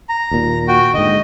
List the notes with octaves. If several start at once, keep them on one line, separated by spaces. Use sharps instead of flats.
A#5
D#2 A#2
F#4 G5
G#2 D3 D#5